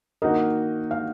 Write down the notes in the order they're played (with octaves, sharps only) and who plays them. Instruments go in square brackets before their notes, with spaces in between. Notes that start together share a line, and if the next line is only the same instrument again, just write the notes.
[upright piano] D#3 A#3 D#4 F#4 A#4 [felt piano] D#5
[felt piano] F5